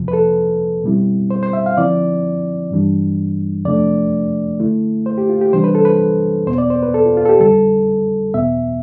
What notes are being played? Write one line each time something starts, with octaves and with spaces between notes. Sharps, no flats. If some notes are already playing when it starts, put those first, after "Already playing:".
Already playing: F2 C3 F3
B4
A4
B2 G3 C4 E4
C5
C5
E5
F5
D3 F3 C4 E4 D5
G2 E3 G3 D4
F2 C3 F3 A3 D4 D5
D3 A3 E4
C5
G4
F4
G4
C3 E3 G3 D4 C5
B4
A4
B4
E2 B2 B3 C5
D5
C5
B4
A4
F4
F4
A4
G4
F2 D3 G3 A4
E2 B2 B3 E5